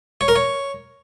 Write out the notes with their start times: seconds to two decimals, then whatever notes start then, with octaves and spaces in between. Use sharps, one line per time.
0.21 C#5
0.28 A#4
0.36 C#5